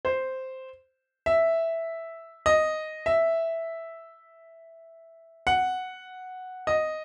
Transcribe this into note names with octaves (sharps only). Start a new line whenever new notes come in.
C5
E5
D#5
E5
F#5
D#5